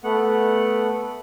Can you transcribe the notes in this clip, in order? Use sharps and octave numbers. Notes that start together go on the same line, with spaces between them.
A3 B3 F#5